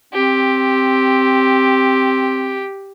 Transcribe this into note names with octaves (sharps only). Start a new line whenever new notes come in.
C4 G4